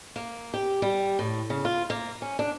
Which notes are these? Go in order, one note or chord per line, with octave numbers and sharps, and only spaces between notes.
A#3
G4
G3
A2
C#3
F4
A#3
C#4
D4